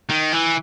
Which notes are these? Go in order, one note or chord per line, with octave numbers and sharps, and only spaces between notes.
D#3
E3